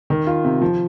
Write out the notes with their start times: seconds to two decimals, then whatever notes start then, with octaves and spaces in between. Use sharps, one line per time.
0.10 D#3
0.27 F4
0.45 C3
0.62 F3